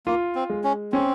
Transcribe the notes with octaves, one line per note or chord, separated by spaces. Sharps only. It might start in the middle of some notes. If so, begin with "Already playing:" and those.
A#3 F4
C4
G#3
C#4
C4 C#4